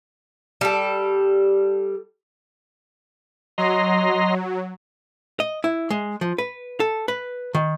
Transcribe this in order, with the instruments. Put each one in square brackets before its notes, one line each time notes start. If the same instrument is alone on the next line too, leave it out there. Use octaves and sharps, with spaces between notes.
[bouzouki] G3 A4
[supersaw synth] F#3 [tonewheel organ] D#5 A#5 C6
[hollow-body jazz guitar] D#5
E4
G#3
F3
B4
A4
B4
D#3